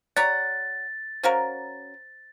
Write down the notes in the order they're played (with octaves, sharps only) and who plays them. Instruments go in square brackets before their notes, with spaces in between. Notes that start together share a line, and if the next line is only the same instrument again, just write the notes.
[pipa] G4 C#5 F#5 [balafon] D5 A#5 [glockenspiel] A6
[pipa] C#4 F#4 A#4 [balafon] C5 F5 A#5